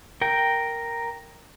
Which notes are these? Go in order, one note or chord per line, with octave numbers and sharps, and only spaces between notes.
A#4 G5